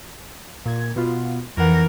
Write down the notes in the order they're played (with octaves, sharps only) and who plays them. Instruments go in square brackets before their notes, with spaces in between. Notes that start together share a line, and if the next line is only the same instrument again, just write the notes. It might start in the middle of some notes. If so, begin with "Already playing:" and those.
[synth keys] A#2 G#6
B2 B3 F4
[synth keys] F2 F#5 [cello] E3 A#4